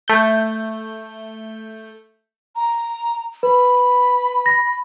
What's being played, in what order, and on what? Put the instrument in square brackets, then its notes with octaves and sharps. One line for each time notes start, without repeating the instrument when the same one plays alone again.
[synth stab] A3 G6
[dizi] A#5
[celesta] B4 [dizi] B5
[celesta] A#6